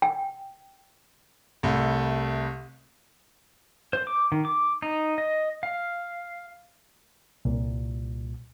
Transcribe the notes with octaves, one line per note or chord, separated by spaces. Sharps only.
G5
C2 A3
C5
D6
D#3
D6
D#4
D#5
F5
C2 A#2